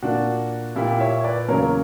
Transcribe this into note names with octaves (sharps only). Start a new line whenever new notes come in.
A#2 A#3 D4 F#4
A#2 A#3 E4 G4
C#5 E5
B4 D5
E2 C#3 F#3 A#3 A#4 C#5